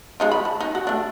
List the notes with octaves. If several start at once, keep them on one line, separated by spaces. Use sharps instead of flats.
G#3 D#4 F4
B5
A5
D#4
F#4
A3 D4